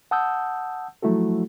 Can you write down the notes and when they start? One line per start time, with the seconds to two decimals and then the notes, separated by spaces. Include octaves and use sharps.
0.11 F#5 A5 D#6 E6 G6
1.02 F3 F#3 A3 E4 F#4 A4